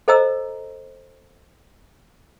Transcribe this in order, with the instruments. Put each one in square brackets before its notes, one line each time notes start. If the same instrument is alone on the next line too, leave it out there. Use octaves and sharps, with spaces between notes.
[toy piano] A4 C5 D#5 A#5 E6